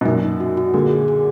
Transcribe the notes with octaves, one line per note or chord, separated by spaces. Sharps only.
B2
F#2 A#2 D#4
D#4
F#4
F#4
A#2 D3 G#4
G#4
G#4